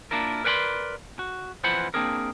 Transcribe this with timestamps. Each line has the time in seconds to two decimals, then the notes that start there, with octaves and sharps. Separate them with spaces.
0.11 A#3 D4 E4 F4 A#4
0.44 A#4 B4 D5 F#5 B5 C6
1.19 F#4
1.64 F2 E3 F4 C5 F#5 B5
1.94 A#3 C4 D4 G#4 A#4